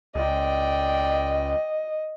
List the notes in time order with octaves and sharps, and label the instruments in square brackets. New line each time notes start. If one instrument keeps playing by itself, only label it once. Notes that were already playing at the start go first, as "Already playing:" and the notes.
[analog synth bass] C#2 [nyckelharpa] D5 G5 [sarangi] D#5